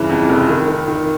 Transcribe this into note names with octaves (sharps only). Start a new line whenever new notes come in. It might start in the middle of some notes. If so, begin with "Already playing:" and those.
Already playing: G2 C#3 E3
F2
F1
D#3
D#3
D#3